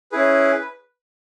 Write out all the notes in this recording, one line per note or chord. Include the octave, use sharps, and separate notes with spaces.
C#4 E4 G#4 B4